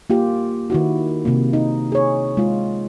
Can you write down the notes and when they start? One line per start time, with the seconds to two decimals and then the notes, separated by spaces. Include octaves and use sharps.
0.10 A#3 F4 G4
0.70 D#3 E4 F#4
1.25 C3 A#3
1.53 D#4
1.92 G#4 C#5
2.37 G#3 F4